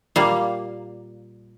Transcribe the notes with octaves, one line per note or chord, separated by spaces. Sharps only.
A#2 G3 A#3 F5